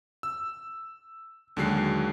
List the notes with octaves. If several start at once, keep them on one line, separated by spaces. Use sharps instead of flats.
E6
D#2 D3 F#3 G#3 F#6 C7